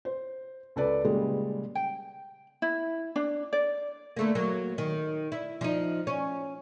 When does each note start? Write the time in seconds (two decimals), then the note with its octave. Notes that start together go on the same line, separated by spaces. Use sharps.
0.05 C5
0.76 C#2 A4 B4 D5
1.04 A#2 C#3 G3 G#3
1.75 G5
2.62 E4
3.16 D4
3.53 D5
4.17 D3 A3 A#3
4.35 F#3 A#3
4.78 D#3
5.32 E4
5.61 F3 D#4
6.07 C#4